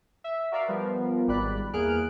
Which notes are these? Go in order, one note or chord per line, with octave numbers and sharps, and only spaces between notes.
E5
F#4 A#4 D5 E5 F5
F3 G3 B3 A#4
G#1 G3 D5 B5 F#6
E2 A#3 G#4 F6 F#6 D7